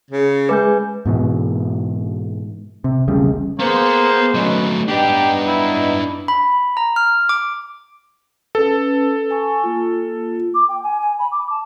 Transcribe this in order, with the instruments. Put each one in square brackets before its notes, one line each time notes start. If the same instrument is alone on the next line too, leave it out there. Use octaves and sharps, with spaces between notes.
[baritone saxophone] C#3
[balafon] G#3 G#4 D6 [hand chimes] B4 G#5 G6
[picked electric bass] G#2 B2 E3
C3
E1 B1 C#3 G3
[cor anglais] A#3 [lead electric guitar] B3 [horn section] G#4 C5
[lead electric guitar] F#3 A3 [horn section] C#4 D#4 B4
[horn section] B3 D#4 [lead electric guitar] D4 B4 [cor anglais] G4
[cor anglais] E4
[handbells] B5
A#5
F6
D6
[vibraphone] C#4 B4 [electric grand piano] A4
[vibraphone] G#5 C#6
A#3 F4
[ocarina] D6
G5
G#5
G#5
B5
D6
A5